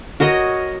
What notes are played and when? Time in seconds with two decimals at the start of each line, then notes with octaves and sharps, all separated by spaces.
0.20 F#4 A#4 C#5 D#5